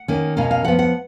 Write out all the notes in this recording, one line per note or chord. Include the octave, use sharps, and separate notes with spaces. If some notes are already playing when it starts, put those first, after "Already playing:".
Already playing: F#5
D#3 A#3 C#4
B2 A#3 C#4 F5
F5
F3 B3 F#5
F#5